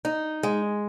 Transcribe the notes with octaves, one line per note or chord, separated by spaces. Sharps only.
D#4
G#3